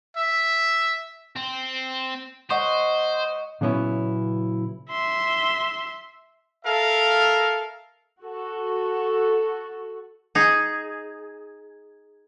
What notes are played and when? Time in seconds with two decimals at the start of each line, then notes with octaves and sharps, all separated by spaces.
0.17 E5
1.36 C4
2.50 C5 C#5 D#5 F#5
3.61 A#2 C#3 F#3 B3 C#4 E4
4.90 E5 C6
6.65 A4 A#4 E5 F5
8.21 F#4 A4
10.35 D#4 G#4